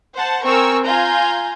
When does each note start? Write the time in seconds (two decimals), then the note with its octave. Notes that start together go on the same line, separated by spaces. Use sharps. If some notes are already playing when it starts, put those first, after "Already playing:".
0.15 C5 F#5 A5
0.44 C4 A#4 G#5 C#6 E6
0.84 F4 G#5 A#5 G6